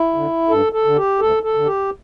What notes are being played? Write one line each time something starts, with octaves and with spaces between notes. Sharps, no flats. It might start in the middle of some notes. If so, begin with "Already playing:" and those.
Already playing: E4
D3
G2 A4
A4
D3
G4
D2 A4
A4
D3
G4